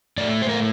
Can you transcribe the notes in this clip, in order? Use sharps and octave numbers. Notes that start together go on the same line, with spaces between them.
A2 A3 D5
C5
A#4